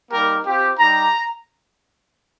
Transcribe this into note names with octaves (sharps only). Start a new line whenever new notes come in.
G3 A#3 D#4 G4 A#4
C4 F4 G4
G3 D#4 G4 A#5